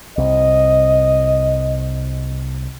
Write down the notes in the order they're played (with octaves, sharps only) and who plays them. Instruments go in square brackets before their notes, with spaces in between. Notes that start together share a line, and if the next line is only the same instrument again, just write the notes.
[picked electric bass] C2 [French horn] D#5